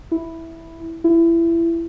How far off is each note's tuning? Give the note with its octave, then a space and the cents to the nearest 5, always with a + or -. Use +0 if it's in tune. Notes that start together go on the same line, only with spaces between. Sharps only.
E4 -5
E4 +20